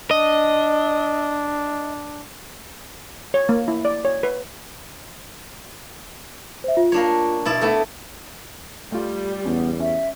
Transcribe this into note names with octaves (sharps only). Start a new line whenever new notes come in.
D4 D#5
C#5
A#3
E4
D5
C#5
B4
C5 E5
F4
A#3 D4 C#5
B2 E4 D5
A3 B3 E4 A4
G3 A3 F4
E2 B3 C#4
C#4 E5